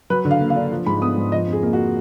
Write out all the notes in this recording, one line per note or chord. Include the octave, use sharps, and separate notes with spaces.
F#3 B4
D3
F5
A#3
F5
D4
F3
G#2 B5
B3 D#6
G#2
F3 D#5
F2
G#4
A#3
F#4